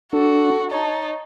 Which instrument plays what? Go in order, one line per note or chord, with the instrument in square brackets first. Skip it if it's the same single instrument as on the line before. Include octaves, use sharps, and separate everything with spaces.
[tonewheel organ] D4 [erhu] F#4 [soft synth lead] A4
[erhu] D#4 [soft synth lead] C#5 [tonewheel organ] A5